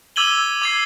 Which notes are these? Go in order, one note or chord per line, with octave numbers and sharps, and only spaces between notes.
D6 E6 G#6 D#7 F#7 G7
D6 G#6 C7